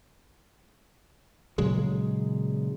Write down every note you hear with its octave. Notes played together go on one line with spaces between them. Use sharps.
A#2 C#3 F#3 G#3